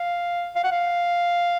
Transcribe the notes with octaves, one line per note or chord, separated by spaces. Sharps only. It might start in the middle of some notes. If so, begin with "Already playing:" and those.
Already playing: F5
F5
F#5
F5